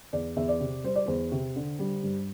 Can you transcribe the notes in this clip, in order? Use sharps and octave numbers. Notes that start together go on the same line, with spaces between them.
E2 D5
E2 E5
D5
C3
G3 C5
D5
E2 C5
C3
D3
G3
G2